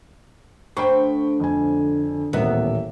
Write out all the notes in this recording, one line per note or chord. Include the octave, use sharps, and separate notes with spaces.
D2 C5 G5 B5 C#6
F2 D3 G#5
D#1 A1 B3 A#4 E5